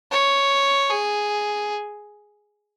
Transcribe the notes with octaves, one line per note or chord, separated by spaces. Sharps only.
C#5
G#4